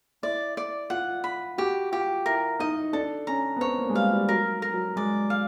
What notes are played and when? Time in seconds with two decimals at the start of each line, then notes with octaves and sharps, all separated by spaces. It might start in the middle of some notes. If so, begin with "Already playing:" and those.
0.23 E4 D5
0.57 D5
0.90 F4 F#5
1.24 B5
1.58 F#4 G4
1.92 F4 G4
2.26 E4 A#4
2.60 D#4 D#5
2.93 D4 A4
3.27 C#4 A#5
3.56 B3
3.61 C4 C#5
3.78 A#3
3.90 G#3
3.95 G3 F5
4.12 G3
4.29 F#3 A#4
4.62 A#4
4.74 F#3
4.96 G#3 D5
5.30 F5